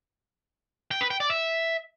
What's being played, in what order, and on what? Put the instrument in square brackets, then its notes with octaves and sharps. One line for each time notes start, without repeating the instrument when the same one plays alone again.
[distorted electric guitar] G5
B4
G5
D5
E5